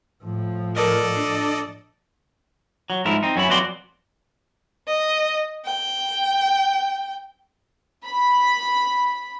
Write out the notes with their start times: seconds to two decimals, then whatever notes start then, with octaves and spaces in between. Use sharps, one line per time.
0.24 A2 F3
0.76 A4 A#4 D5 D#5
1.15 D4
2.90 F#3
3.05 G#2 F3 G#3 E4 A#4
3.23 C4 D#4
3.36 F#2 C#4 E4 B5
3.49 F2 F#3 B3 F#4 D5 C6
4.88 D#5
5.65 G5
8.04 B5